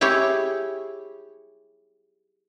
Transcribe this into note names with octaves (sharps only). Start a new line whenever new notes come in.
E4 G4 G#4 C#5